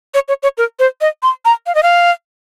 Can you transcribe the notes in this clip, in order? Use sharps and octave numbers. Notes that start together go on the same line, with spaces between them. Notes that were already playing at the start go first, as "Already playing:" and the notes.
C#5
C#5
C#5
A#4
C5
D#5
C6
A#5
F5
D#5
F5